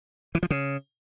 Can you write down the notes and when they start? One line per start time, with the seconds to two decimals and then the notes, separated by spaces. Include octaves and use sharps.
0.35 E3
0.43 F3
0.50 C#3